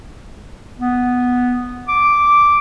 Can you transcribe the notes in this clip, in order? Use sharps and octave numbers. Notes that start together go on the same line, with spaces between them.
B3
D6